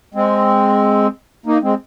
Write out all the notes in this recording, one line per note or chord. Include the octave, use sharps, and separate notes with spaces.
G#3 C4
A#3 D#4
G#3 C4